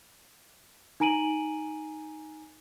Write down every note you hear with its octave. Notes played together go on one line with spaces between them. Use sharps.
D#4 G#5 A#5 D7 D#7 F#7